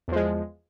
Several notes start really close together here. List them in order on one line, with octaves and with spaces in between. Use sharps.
E2 F3 G#3